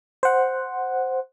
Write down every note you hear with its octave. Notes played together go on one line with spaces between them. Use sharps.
C5 F#5